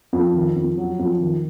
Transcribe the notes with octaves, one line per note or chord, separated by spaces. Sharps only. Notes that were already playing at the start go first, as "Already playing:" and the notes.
F2
D#3
F2
F#3
F2
D#3